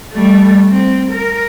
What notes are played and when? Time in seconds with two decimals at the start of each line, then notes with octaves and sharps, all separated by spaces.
0.12 G3 A3
0.69 C4
1.10 A#4